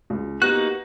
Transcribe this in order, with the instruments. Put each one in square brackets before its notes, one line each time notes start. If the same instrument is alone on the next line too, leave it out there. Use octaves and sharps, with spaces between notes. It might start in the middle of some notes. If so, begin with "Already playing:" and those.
[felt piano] C#2
[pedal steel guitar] A#3 D#4 F#4 [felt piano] B3 [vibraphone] G4 [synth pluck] F#6